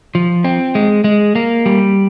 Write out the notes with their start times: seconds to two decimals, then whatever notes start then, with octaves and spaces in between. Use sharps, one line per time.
0.15 F3
0.44 C4
0.75 G#3
1.04 G#3
1.35 A#3
1.66 G3